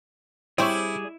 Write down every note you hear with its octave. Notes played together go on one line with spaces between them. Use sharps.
G3 C4 E4 G#4 C#5 D5 G6